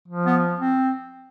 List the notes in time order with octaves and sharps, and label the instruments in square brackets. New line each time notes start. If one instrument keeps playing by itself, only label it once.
[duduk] F3
[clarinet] B3
C4